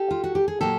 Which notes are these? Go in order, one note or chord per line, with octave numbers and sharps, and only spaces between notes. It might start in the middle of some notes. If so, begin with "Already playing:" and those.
Already playing: G4 A4
F4
F#4
G4
G#4
A#2 F#3 A#3 G4 A4